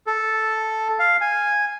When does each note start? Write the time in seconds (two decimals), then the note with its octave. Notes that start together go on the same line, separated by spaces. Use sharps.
0.07 A4
0.99 F5
1.21 G#5